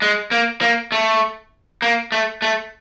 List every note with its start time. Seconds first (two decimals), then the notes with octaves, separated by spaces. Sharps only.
0.02 G#3
0.31 A#3
0.61 A#3
0.92 A3
1.82 A#3
2.12 A3
2.42 A3